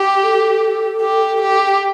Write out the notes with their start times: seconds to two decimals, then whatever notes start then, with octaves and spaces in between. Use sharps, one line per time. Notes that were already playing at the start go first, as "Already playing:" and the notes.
Already playing: G4
0.23 A4
1.01 G4
1.41 G4